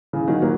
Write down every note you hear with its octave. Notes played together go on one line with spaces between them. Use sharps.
C#3 E3
D#3 F#3
F#3 A#3